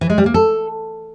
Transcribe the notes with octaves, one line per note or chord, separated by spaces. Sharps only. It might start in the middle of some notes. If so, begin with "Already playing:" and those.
E3
G#3
G3
A#3
A4